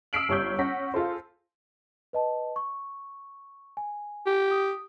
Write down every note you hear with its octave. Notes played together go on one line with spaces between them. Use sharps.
E6 F6 B6 C7 D7 F#7
G1 G4 C#5 C#6 E6 G6
C#4 F#5 C#6 A#6 B6
F4 G#4 A4 C5
B4 D#5 A5
C#6
G#5
G4
D#6